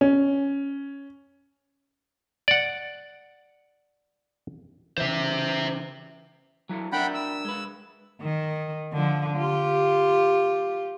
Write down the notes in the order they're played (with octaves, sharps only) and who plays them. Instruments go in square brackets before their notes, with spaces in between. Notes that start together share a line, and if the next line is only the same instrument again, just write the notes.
[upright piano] C#4
[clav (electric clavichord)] D5 F#5
[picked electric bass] C#3 E3 [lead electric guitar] C5 E5
[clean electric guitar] F#3 E4 A4
[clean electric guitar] D4 A#4 E5 [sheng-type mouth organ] F#5 G5 B5
[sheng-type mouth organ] E6
[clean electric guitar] G#3 B4
[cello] D#3
D3 F3
F4 G4